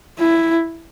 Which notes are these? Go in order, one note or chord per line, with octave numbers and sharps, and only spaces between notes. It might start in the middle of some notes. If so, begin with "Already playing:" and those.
E4